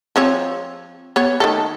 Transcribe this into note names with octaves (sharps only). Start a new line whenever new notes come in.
F3 C4 C#5
B3 C#5
D#3 A3 A4